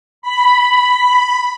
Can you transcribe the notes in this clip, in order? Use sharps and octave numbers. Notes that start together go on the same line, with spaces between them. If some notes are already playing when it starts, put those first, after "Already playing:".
B5